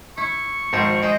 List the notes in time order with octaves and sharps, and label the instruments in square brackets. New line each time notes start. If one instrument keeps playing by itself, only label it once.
[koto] E4 [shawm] C#6
[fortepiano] G#1 [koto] F3 C5
[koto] G#3 C5 [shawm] D#5